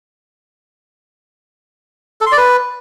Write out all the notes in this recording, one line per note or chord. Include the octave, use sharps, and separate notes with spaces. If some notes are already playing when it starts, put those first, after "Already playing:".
A4
C6
D5
B4